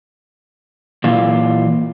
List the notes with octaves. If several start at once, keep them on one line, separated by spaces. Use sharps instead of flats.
A#2 E3 F4